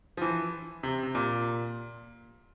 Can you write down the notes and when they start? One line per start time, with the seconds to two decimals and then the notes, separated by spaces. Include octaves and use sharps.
0.17 F3
0.22 E3
0.83 C3
1.03 C3
1.15 A#2